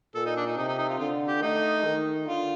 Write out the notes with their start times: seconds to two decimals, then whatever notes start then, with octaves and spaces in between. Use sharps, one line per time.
0.15 A#2 A4
0.25 D#4
0.36 D4
0.46 D#4
0.57 C3 D#4
0.68 D#4
0.78 D#4
0.89 F4
0.99 D3 F4
1.27 G4
1.42 A3 D#4
1.84 D#3
2.26 D3 F4